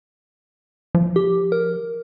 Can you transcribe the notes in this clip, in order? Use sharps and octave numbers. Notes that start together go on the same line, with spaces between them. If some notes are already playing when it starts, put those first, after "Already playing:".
F3
G4
A#4